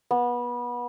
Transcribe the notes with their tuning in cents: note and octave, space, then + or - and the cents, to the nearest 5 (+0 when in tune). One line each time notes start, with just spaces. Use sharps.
B3 -25